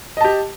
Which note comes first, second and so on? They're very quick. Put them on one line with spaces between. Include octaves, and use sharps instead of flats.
D#5 A5 G4